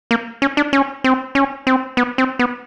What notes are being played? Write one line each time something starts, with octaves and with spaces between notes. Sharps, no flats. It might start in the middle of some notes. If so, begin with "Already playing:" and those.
A#3
C#4
D4
C#4
C4
C#4
C4
B3
C4
B3